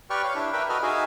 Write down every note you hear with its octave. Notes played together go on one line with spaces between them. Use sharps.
G4 B4 D5 G5 C#6 F6
C#5 F5
D4 E4
A#4 B4 E5 G5
F#4 A4 B4 D#5 F6
D#4 F#4 G#4 E5 F5 G#5